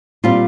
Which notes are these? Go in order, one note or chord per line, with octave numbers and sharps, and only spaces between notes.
A#2 G3 C4 F4